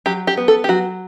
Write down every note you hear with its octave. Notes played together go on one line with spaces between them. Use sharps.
F#3 G4
G4
B3
A4
G4
F#3 F#4